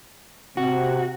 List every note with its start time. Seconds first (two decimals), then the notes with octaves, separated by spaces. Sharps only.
0.57 C3 F#4